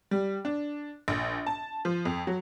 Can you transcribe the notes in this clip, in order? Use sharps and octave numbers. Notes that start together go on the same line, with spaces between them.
G3
D4
A#1
A5
F3
F2
F#3